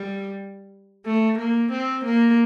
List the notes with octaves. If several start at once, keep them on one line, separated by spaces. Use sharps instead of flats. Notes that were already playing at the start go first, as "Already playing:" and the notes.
Already playing: G3
A3
A#3
C4
A#3